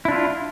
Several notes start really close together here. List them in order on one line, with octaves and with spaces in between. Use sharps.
E4 D4 F4